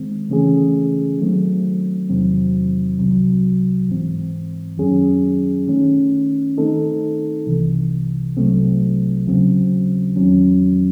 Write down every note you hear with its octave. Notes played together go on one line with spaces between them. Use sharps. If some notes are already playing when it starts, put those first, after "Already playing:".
Already playing: D#3 G#3 C4
C#3 E3 A3 C#4 G#4
D#3 F#3 A3 C4
E2 C3 D#3 F#3 C4
C2 C3 F#3
G#2 E3 C4
F#2 D#3 F#3 C#4 G#4
D#3 A3 C#4
D#3 A3 C4 D#4 A4
C2 C3 E3
C2 C3 F#3 A3 C4
D#2 C#3 F#3 C4
E2 D#3 F#3 C#4